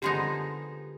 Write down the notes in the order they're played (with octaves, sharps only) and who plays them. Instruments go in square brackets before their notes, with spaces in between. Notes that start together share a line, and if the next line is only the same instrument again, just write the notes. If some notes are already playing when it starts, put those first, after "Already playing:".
[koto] D3 F3 G#3 B3 D#4 [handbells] G4